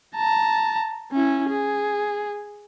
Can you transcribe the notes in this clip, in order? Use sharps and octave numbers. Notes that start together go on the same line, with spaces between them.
A5 A#5
C#4 E4
G#4